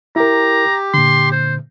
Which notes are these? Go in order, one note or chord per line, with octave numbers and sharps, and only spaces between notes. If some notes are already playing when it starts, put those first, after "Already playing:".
E4 G4 A#4 A#5
A#2 D3 C6
C5